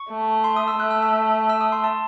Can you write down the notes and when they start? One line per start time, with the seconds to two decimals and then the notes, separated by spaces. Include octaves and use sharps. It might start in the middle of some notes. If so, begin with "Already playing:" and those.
Already playing: C#6
0.10 A3
0.44 C6
0.56 D#6
0.68 E6
0.79 A3 F#6
0.91 E6
1.02 E6
1.49 E6
1.61 D#6
1.72 C6
1.84 A5